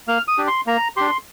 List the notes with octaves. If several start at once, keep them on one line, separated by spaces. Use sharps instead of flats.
A#3 F6
D#6
D4 G4
C6
A#3 A#5
D4 G4 C6